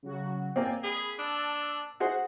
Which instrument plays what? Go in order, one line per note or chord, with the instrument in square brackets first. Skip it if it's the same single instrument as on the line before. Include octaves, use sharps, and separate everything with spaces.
[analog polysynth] C#3 F#3 F#4
[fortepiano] A#3 C4 [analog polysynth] D5 G5 G#5
[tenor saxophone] G#4 [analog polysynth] B5
[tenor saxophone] D4 [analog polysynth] A5 E6
[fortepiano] F#4 G#4 C5 [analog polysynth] F#5